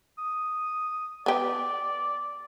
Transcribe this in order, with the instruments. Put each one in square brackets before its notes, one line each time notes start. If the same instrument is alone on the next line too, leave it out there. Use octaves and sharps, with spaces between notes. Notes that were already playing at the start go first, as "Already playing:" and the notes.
[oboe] D#6
[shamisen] B3 G4 [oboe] D5